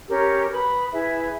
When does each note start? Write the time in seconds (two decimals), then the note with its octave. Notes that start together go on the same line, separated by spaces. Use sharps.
0.09 C#4 G4 A#4
0.52 B4 B5 D#6
0.92 E4 G#4 B4 E5